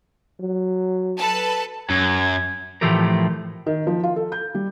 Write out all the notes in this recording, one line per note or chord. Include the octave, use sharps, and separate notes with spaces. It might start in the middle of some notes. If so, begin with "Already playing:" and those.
F#3
A4 B4 A5
F#2 G#6
A2 E3 F3 A3 G4 A#4
D#3
F3
F4
A4
G6
G3